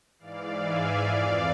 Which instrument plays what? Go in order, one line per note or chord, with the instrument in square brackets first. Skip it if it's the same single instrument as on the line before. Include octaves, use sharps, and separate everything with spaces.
[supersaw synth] G#2 E3 D5 F5
E5 G#5
F2 E3 D5 F5